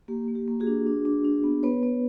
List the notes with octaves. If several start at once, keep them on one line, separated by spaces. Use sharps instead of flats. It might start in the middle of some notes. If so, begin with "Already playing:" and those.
A#3 G4
A#3
G4
A#3
F#4 G#4
D4
D4
D4
D4
B3
B3 B4 C#5
B3